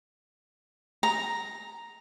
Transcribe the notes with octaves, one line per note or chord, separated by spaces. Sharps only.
A#5